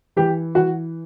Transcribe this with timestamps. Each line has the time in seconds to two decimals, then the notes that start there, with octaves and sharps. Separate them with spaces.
0.16 E3 G4
0.55 E3 F#4